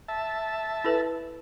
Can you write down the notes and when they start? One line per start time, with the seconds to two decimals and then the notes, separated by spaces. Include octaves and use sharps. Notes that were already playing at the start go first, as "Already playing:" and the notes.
0.08 E5 A5
0.84 E4 A4 B4